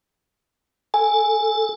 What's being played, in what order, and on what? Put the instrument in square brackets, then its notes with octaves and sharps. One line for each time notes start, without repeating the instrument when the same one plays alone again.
[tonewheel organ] A4 [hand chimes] G#5